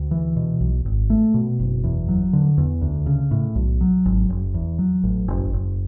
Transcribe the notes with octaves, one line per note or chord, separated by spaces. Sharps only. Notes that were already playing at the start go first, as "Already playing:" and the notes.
Already playing: D2
E3
B2
B1
G#1
A3
B2
F#1
E2
F#3
D3
E2
D2
C#3
A2
B1
F#3
G#1
F#1
E2
F#3
A1
F#1
F#1